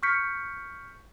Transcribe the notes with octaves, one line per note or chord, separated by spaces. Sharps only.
C#6 F6 G6 B6 C#7